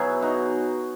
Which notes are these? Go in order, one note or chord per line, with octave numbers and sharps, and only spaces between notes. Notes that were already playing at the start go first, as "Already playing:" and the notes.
Already playing: B2 F#3 E4 G#4
D#4 F#4